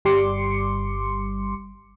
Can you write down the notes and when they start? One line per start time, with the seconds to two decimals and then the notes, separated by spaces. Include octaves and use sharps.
0.05 G1 G3 C6 D6 C#7